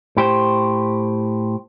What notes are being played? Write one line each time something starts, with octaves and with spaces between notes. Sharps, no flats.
A2 G4 C5